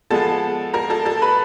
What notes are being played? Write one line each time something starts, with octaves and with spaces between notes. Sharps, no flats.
F3 G#3 B3 A4 A5
A#4 A#5
A4 A5
A4 A5
B4 B5